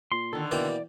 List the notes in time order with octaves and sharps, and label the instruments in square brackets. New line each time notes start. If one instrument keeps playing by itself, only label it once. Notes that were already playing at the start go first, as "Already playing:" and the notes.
[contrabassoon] A#2 [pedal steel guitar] C6
[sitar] D3 D#3 [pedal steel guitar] A4
[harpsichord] B2 A#3 G5 [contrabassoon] E3 [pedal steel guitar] D5